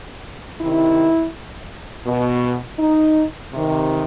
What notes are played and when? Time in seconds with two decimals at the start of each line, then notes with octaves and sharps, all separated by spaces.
0.61 C3 D#3 E4
2.07 B2
2.79 D#4
3.53 C3 D#3